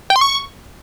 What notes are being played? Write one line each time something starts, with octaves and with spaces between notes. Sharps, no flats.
G5
C6
C#6